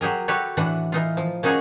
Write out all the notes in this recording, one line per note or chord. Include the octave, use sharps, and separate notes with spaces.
F#3 G4 G#4 A#4
F#4 G4 A4 B4 C#5
A2 E3 D4 F#5
E3 D#4 F4
F3
A#3 C#4 D#4 F#4 G#4 C#5